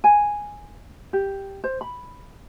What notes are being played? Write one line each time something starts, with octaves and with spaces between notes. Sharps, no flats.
G#5
G4
C5
B5